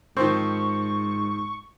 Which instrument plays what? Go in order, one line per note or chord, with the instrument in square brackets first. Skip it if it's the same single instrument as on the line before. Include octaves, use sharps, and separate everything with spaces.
[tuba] G#2 [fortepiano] D#3 F3 C4 [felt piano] C5 [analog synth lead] C#6